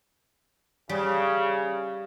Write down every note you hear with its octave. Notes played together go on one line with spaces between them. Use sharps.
C#3 G3